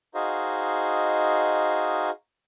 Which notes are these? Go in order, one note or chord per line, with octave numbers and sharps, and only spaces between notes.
D#4 F#4 G#4 C5 D#5 F5